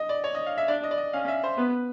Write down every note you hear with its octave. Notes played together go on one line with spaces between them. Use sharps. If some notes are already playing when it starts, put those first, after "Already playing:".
Already playing: D#5
D5
C#5
D#5
F5
E5
D4 D5
D#5
D5
D#5
C#4 F5
E5
C5
B3 B4